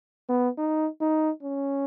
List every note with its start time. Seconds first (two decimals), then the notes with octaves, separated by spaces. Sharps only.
0.29 B3
0.58 D#4
1.01 D#4
1.43 C#4